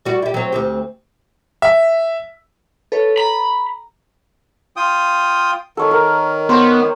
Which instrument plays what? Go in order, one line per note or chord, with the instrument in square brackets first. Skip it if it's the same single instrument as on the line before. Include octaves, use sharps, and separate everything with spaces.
[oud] G3 F#4
E4 G4
F#3 C4
D2 C4 G4
[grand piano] E5
[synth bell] A4 B4 C#5
[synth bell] A#5 [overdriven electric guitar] B5
[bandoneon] F4 G5 D#6
[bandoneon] D#3 [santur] A4 C#5
[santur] A#4
[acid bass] B3 [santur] C5 C#5